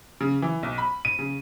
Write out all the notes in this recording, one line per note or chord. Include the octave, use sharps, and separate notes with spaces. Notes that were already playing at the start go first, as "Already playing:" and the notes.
C#3
E3
B1
B5
D#7
C#3